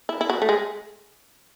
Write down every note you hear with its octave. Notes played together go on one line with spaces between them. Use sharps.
E4
E4
F#4
A3
G#3